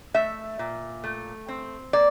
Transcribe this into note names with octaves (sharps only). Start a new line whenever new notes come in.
A3 E5
A#2
A3
C4
A#3 D5